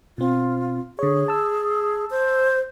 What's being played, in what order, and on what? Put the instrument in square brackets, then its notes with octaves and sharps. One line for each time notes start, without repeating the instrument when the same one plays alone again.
[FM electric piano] B2 C4 [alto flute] F4
[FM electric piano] D3 C#5 [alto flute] G#4
[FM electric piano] A5 E6
[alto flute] C5